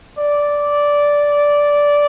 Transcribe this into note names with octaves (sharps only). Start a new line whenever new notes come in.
D5